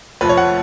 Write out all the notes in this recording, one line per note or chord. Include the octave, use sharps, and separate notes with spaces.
F1 F2 F3 A3 B4
C#5
F#5